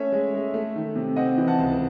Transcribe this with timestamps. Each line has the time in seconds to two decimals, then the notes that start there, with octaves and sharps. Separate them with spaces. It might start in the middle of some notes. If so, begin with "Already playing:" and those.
Already playing: A3 C#4 C#5 E5
0.12 G#3
0.34 G#3
0.54 A3
0.76 D#3
0.96 C3
1.16 C4 D#5 F#5
1.38 E3
1.47 F#5 A5
1.58 C#2